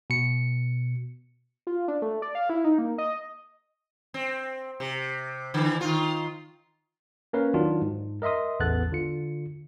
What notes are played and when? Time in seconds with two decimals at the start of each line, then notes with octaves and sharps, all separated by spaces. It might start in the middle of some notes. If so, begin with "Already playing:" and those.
0.10 B2 C#7
1.67 F4
1.88 D4
2.02 A3
2.22 D5
2.35 F5
2.50 E4
2.64 D#4
2.78 A#3
2.98 D#5
4.14 C4
4.80 C3
5.54 D3 E3
5.81 D#3 F4
7.33 A#3 C#4 A#4 B4 C#5 F5
7.54 D#3 F#3 D4 F4 F#4
7.82 G#2
8.22 A#4 D#5 E5 C6 D#6
8.60 A1 E2 B3 A4 F#6 A6
8.92 D3 F4 C#7